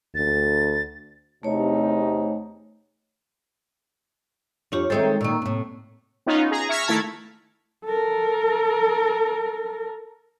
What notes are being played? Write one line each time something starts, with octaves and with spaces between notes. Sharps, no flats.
D2 A6
E2 C3 A3 D#4 C#5
F2 D4 F4 G4 C#5
D#3 G#3 C4 A4 C#5 E5
A#2 D#3 A#3 C#6 E6
A2 C3
B3 C#4 D#4 F4
G#4 A#5
E5 C#6 F6 G#6 A#6 B6
D#3 A3 E4 E5 A5 G#6
A4 A#4